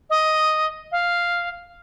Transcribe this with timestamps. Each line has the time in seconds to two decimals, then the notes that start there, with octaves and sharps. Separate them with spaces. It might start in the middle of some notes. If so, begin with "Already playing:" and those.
0.10 D#5
0.92 F5